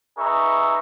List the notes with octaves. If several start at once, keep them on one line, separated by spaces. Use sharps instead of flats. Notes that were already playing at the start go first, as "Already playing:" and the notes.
D#4 G#4 B4 E5 A#5 C#6